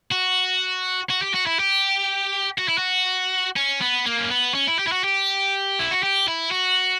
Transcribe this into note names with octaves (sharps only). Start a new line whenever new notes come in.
F#4
F#4
G4
F#4
E4
G4
F#4
E4
F#4
C#4
B3
A#3
C#4
B3
C#4
E4
G4
E4
F#4
G4
E4
F#4
G4
E4
F#4